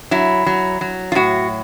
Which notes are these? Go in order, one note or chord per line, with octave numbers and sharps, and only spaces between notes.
F#3 E4
F#3
F#3
F4
A2 F#4